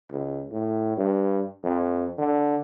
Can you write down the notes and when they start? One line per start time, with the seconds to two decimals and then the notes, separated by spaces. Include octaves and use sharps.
0.11 C#2
0.52 A2
0.98 G2
1.64 F2
2.18 D3